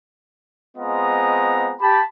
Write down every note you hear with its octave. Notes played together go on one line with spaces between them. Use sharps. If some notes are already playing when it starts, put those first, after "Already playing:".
G#3 B3 C4 F4 D#5 A#5
G4 A5 B5